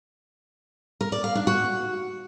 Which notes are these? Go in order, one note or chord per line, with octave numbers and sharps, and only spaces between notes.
A#4
D5
F5
D4
F#4